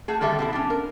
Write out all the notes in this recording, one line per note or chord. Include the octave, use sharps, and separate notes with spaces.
A3 F#4 G#4
D3 D#3 G3 A4 E5
B2 D#4 E4
C#4 D4
A#4